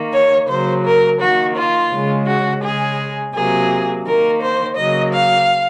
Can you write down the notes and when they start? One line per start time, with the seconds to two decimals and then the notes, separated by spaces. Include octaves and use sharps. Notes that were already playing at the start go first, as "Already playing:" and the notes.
Already playing: D#3 A#3
0.13 C#5
0.48 C#3 F#3 A#3 C5
0.84 A#4
1.20 D#3 A#3 F#4
1.55 F4
1.91 C#3 G#3
2.27 F#4
2.62 C#3 G#3 G#4
3.34 C3 F#3 A#3 G#4
4.05 D#3 A#3 A#4
4.41 C5
4.76 C#3 F#3 A#3 D#5
5.12 F5